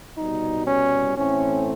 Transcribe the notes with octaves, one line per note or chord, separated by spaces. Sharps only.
C2 B2 G3 D#4
C#4
A2 E3 A3 C4 C#4